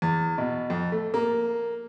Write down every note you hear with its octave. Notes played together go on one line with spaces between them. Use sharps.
E2
B2
F2
A3
A#3